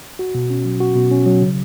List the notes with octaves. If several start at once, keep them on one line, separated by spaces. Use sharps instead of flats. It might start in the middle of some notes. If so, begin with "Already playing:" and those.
F#4
B2
C#4
F#3
F#4
B2
C#4
F#3
C#3